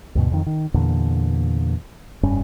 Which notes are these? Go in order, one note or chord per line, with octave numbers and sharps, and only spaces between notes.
D2 G2 B2
F2 D#3
D#3
E2 A#2 D3
F1 G2 C#4